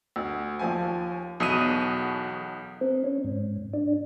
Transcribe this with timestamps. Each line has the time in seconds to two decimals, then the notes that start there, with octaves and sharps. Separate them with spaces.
0.16 D2
0.59 D#2 F3 G#5
1.40 B1 E2 B2 D#6 D#7
2.81 C4
3.04 C#4
3.24 G#2
3.73 D4